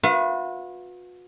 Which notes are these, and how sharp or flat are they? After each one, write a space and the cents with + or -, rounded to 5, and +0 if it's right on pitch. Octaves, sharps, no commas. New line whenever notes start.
F#4 -45 B4 +0 E5 +45